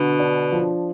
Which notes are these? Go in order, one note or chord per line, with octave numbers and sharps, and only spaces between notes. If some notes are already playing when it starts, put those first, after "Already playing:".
Already playing: B2 D3
D4
F3